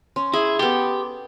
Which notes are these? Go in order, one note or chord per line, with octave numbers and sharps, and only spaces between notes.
C#4 C6
E4 G#4
B3 G4 A4